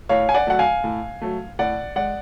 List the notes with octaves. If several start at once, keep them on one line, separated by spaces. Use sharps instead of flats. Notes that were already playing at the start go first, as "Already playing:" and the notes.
A2 C#5 F5
G#5
D5 F#5
F#3 A3 F#5
F5 G#5
A2
F#3 A3
A2 D5 F#5
G#3 D5 F#5